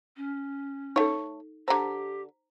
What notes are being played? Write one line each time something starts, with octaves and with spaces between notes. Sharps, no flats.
C#4
A3 D#4 A4 C#5
D3 G4 A4 C5 A#5